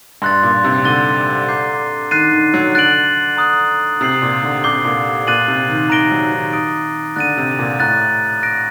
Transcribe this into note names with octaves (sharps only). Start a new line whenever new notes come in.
G2 C6 F#6 A6
A#2
C3
D3 F#6 A6 D#7 G7
A#5 D6 G6 C7
D#3 F#6 A6 C7 D#7
D#3
F#3
D3 F#6 A6 D7 F#7
A#5 D#6 F#6
C3 D#6 G6 C7 F#7
A#2
D3
C3 D6 G6 C7 G7
A#2
A#2 F#6 A6 D#7 F#7
C3
D#3
D#3 A#5 F#6 A#6 D7 G7
F#3
D#3
D#6 A6 D7
D3 F#6 A6 D#7
C3
A#2
A2 A#5 F#6 A6
F#6 A#6 D7